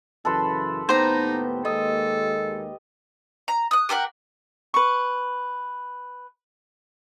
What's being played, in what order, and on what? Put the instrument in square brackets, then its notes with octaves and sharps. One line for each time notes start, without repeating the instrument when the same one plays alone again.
[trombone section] F#2 C#3 E3 [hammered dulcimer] A4 B4 C6
[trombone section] D#2 A2 B3 [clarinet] D#4 [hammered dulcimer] G4 [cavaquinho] C5 A#5
[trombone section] D#2 G#3 A#3 [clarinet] A4 [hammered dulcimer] D#5
[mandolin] A#5
D#6 F#6
G4 A4 A#4 F#5
[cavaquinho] B4 C#6